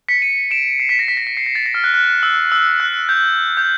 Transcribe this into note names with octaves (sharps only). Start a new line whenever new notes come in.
B6 C#7
C#7 D#7
D7 E7
C7
B6
A#6
B6
A#6
B6
C7
A#6
A6
A#6
F6
F#6
F#6
E6
E6
F#6
G6
G6